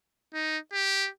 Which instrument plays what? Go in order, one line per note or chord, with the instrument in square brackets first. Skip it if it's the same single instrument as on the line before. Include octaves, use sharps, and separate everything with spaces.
[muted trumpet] D#4
G4